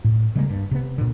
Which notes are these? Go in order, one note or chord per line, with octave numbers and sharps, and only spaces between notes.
A2
C#3 G3 G#3 A#3
G2
C3 B3
A#2 D3